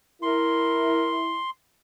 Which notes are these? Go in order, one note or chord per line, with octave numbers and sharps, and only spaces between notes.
E4 A#4 C6